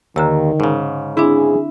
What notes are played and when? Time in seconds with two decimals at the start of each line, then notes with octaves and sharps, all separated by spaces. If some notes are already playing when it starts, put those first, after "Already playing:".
0.16 D#2 D3 D#3 A#5 E6
0.60 G#2 C#3
1.17 C4 D4 E4 G#4